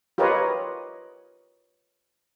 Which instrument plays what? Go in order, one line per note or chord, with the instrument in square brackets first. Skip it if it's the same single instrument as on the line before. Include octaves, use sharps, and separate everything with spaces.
[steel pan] F4 G4 A#4 B4 C#5 D#5